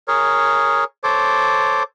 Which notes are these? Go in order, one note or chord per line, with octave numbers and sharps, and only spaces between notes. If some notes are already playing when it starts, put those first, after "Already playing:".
G#4 A#4 C#5
A4 C5 C#5 D6